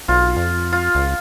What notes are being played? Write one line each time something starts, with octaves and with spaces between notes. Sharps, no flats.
B1 F4
F2
F4
C#2